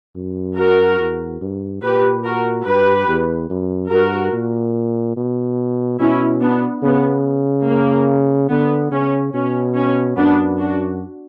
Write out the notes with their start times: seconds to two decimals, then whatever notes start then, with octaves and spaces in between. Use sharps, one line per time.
0.16 F#2
0.57 F#4 A#4
1.00 E2
1.41 G2
1.83 A#2 G4 B4
2.24 F#4 A#4
2.66 G2 G4 B4
3.08 E2
3.50 F#2
3.91 G2 F#4 A#4
4.33 A#2
5.17 B2
6.00 B2 C#4 E4
6.41 B3 D4
6.83 C#3 B3
7.67 A#3
8.50 D3 B3
8.91 C#3 C#4
9.34 B2 C#4
9.76 C#4
10.17 F#2 B3 D4
10.58 D4 F#4